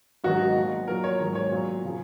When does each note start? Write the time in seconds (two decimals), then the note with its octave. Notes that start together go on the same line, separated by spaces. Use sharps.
0.24 G#2 D#3 F#3 F#4
0.35 D#4
0.56 A#2 F3
0.88 A#2 F#3 A#4
1.04 C#5
1.19 G#2 D#3 F#3
1.35 C#5
1.51 A#2 F#3
1.85 C#3 F3